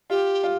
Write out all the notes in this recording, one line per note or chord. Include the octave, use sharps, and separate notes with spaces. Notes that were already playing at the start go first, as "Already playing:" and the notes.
F4 G4
F4